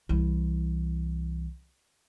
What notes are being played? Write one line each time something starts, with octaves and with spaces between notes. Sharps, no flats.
C2 E3